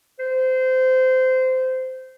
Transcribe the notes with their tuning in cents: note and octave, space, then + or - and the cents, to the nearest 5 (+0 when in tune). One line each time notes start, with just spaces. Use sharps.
C5 -20